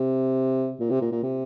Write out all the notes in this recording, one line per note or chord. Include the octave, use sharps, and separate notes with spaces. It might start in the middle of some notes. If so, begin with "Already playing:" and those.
Already playing: C3
A#2
C3
A#2
A#2
C3